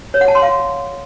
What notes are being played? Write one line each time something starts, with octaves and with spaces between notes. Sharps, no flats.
C#5
F#5
A5
C6
F5